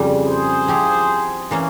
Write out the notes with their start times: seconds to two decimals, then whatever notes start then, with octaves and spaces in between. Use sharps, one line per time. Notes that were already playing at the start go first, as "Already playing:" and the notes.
Already playing: F2 C#3 G3
0.26 G#4 C5
0.68 F3 C4 E4 G4
1.51 E3 A#3 C#4